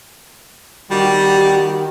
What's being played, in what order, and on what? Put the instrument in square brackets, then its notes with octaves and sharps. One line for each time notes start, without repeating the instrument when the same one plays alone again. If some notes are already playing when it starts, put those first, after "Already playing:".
[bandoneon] D#3 [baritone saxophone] G3 [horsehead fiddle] F#4 G4